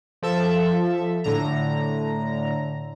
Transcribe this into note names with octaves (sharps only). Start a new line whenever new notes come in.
F3 A4 E5
A2 D3 A#5